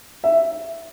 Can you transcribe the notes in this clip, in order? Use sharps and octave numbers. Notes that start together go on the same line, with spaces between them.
E5